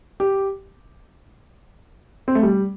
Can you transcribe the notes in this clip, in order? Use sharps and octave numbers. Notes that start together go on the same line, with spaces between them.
G4
C4
A3
G3